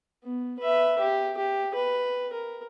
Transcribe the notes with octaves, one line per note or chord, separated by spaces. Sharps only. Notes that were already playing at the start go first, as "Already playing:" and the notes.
B3
B4 E5
G4
G4
B4
A#4